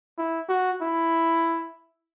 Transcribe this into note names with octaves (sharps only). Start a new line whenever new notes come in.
E4
F#4
E4